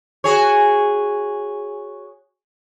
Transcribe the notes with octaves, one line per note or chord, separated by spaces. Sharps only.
F#4 G#4 C#5